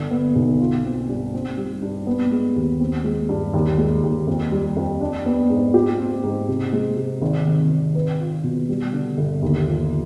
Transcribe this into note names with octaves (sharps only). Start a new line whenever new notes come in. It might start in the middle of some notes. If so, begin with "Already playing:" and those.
Already playing: G1 D4
B3
B1
F4
C4
G2
C4
G3
G2
B3
G#3
D#2
C4
G#3
G2
D#2
G#3
D#2
F2
G3
F2
D4
B3
G#2
G4
C4
G#2
C3
G#3
C3
G#1
D#3
G#1
B4
F4
B2
G3
D3
G1
D#2
F3